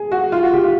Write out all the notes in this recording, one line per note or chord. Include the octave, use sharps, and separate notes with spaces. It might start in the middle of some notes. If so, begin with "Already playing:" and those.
Already playing: G#4
F#4
F4
F#4
G4
F4